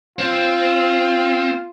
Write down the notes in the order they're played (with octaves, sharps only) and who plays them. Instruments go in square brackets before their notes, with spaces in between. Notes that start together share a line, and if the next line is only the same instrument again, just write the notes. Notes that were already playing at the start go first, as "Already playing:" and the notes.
[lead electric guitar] C4 [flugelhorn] F4